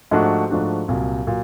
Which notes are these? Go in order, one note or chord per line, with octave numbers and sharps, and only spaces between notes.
G#2 F3 A3 D4 F#4
G#2 F3 A3 D4 F#4
C2 A#2 F#3
A#2 F#3